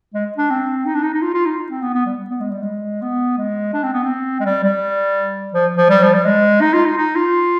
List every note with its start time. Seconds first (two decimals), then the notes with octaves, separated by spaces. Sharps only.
0.14 G#3
0.38 D4
0.51 C4
0.86 D#4
0.95 D4
1.03 D#4
1.14 D#4
1.22 F4
1.34 F4
1.46 D#4
1.58 D#4
1.70 C4
1.82 B3
1.94 B3
2.06 G3
2.30 B3
2.40 G#3
2.51 G3
2.63 G#3
3.02 B3
3.38 G#3
3.74 D4
3.84 C4
3.93 B3
4.04 C4
4.40 G#3
4.46 G3
4.64 G3
5.54 F3
5.77 F3
5.90 G3
6.03 F3
6.14 G3
6.26 G#3
6.61 D#4
6.74 F4
6.86 D#4
6.97 D#4
7.16 F4